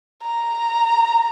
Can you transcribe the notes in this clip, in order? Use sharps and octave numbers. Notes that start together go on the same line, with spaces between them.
A#5